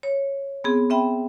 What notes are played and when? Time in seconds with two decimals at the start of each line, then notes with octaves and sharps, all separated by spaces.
0.03 C#5
0.64 B3 C4 G#4
0.90 C4 E5 G5 B5